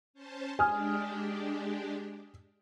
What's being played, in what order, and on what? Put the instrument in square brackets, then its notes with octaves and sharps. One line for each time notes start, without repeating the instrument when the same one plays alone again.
[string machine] C#4 C5 A5
[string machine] G#3 D4 G4 [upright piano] G#5 D#6 F6